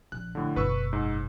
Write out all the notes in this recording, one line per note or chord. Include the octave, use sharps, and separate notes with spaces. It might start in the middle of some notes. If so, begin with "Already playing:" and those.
A#1 F#6
A2 D3
F#1 B2 B4 C#6 E6
G#2